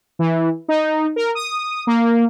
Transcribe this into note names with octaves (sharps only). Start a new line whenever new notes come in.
E3
D#4
A#4
D#6
A#3